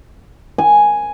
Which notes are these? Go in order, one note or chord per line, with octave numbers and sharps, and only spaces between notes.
G#5